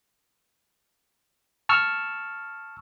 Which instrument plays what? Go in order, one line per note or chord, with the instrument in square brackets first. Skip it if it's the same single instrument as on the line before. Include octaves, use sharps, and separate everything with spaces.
[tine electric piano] A5 C#6 E6 F6